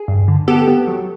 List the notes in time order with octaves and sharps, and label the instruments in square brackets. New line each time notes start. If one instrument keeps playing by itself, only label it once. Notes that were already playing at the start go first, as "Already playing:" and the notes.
Already playing: [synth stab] G#4
G2
D3
B3 G4 A4
B3
F#3